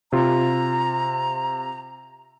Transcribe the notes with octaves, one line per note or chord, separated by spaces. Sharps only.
C3 F4 A#5